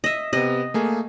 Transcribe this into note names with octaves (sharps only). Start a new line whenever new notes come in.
D#5 E5
C3 B3 D#5
A3 A#3 G#4